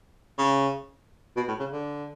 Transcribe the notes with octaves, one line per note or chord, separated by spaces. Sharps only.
C#3
B2
A2
C#3
D3